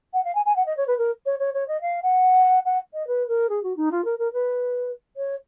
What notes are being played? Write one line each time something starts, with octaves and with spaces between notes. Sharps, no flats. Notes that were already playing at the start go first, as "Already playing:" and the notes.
F#5
F5
G#5
G#5
F#5
D#5
C#5
B4
A#4
C#5
C#5
C#5
D#5
F5
F#5
F#5
D#5
B4
A#4
G#4
F#4
D#4
F4
A#4
A#4
B4
C#5